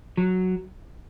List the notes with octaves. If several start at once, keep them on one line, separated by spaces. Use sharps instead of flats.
F#3